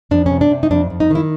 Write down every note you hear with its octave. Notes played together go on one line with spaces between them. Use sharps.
F2 D4
C3 C#4
D4
C3
D#4
F2 D4
F2
D#4
D#3 E4